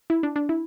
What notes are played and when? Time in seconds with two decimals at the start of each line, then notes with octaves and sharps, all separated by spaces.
0.10 E4
0.23 D4
0.36 D4
0.49 E4